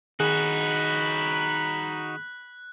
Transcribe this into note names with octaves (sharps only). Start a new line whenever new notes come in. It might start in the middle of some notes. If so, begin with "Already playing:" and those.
D#3 D#4 F#4 G#4 B5 F#6